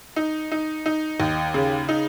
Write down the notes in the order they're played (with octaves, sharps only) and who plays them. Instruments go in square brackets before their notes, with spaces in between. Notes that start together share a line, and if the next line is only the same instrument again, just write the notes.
[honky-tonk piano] D#4
D#4
D#4
D#2
C#3
D#4